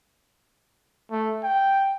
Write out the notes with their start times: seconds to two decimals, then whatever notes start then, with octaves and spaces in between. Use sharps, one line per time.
1.11 A3
1.44 G5